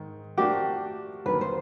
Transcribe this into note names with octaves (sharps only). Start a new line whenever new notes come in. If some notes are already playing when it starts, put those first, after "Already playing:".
Already playing: G#2 D#3
F3 A3 D4 F#4 G4 A#4
D#2 D3 F#3 A#3 B4
C5